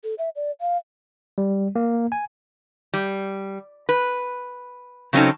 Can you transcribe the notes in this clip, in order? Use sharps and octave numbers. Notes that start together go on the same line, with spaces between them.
A4
E5
D5
F5
G3
A#3
G#5
G3
B4
C#3 F#3 C4 C#4 D#4 A4